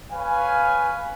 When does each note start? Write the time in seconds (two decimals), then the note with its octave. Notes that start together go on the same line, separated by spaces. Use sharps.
0.11 B4 C#5 F5 G#5